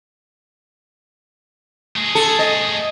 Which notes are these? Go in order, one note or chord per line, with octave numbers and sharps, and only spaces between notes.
A3 G#4
A4
D#5